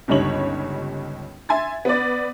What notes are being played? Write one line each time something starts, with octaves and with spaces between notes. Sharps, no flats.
G1 C#2 G3 D#4 C#5 F#7
E5 G#5 C6 G#6 A6
B3 D5